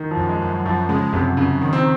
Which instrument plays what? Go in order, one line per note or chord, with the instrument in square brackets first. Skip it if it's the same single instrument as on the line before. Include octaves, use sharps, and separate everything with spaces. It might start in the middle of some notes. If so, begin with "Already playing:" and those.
Already playing: [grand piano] D#3
F3
[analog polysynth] F#2
[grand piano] G#3
[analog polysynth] F#2
[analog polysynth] F#2 [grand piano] F3
[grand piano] C#3 [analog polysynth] G#3
[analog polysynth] F#2 [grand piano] C3
[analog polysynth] F#2 [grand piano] C#3
[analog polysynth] D#3
[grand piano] C4